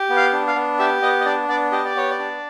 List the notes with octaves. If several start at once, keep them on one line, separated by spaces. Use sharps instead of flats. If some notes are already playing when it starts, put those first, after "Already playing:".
Already playing: G4
B3
F5
D4
F5
B3
G4 E5
B3 D#5
D#5
D4 D5
B3 D5
G4 D#5
D5
B3 C#5
D5
D4